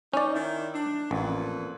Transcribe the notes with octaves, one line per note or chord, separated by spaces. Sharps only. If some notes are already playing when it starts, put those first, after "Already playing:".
C#4 D#4 D5
D#3 E4
D4
A1 F2 A#2 B4